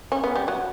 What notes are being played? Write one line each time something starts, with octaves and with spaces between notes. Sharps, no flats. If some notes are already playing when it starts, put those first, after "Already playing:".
C#4
B3
G3
F#3